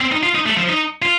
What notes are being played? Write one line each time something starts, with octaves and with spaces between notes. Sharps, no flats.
C4
D#4
F4
D#4
A3
F3
D#4
F4